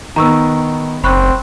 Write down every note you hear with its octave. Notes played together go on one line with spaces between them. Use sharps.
D#3 B3 A#5 C#6 E6
F#1 C4 B5 C#6 F#6